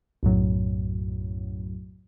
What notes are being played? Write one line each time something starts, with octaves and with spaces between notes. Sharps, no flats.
B1 F#2 A2 F#3